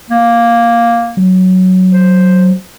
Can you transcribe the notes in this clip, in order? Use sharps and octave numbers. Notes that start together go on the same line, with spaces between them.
A#3
F#3
C5